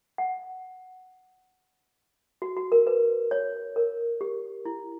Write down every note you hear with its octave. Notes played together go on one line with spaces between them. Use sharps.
F#5
F#4
F#4
A#4
B4
C#5
A#4
G4
E4